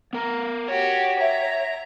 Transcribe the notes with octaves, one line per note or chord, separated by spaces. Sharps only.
B3 A#4 A#5
F#4 G4 C#5
E5 A#5